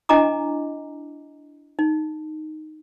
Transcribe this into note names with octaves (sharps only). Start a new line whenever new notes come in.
D4 E4 D#5 G#5 A#5 D6
D#4